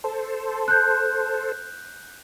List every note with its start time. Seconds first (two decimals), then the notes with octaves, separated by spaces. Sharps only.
0.04 A4 C5
0.68 F#6 G6